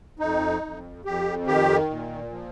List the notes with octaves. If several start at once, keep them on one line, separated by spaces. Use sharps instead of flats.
F2 D#4
F2
F2 G4
D#3 G4
A#2
F3